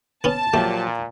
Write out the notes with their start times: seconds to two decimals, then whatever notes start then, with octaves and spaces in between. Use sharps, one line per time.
0.24 B3 C#4 A5
0.54 A#2 F3 F#3 A3 G4